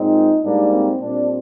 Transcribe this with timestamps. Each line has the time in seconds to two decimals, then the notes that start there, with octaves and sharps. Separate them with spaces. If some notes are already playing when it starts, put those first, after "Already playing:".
Already playing: A#2 G#3 C4 D#4
0.42 G#2 G3 A#3 D4
0.71 C4
1.01 A#2 G3 C4 D4